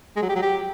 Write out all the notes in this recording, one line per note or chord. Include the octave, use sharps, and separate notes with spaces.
G#3
F#3
G4
F#3
G4